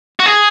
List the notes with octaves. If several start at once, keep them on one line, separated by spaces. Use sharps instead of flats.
F#4
G#4